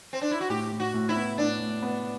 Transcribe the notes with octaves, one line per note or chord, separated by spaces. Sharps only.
C4
D4
E4
F#4
A2 G4
A2
F#4
A2
E4
B3
A2 D4
A2
B3